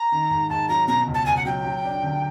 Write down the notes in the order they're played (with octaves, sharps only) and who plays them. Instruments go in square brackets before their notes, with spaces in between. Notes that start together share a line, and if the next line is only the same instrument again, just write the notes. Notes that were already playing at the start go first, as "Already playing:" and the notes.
Already playing: [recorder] A#5
[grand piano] D#3
G#2
[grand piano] G#2 [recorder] A5
[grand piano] F#3 [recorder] A#5
[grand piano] B2 [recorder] A#5
[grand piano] C#2
[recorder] A5
[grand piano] C#2 [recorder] G#5
[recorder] F#5
[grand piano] F#3 [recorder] G5
[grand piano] F#3
D4
D3